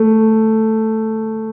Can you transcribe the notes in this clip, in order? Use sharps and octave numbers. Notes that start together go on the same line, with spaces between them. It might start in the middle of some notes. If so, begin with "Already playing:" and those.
Already playing: A3